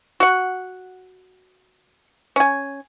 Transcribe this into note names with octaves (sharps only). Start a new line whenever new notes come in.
F#4 F#5
C#4 G#5